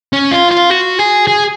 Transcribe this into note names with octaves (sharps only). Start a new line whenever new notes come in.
C#4
F4
F4
F#4
G#4
G#4